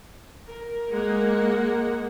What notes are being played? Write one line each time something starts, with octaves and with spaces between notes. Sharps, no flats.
A#4
G#3 A#3 F#5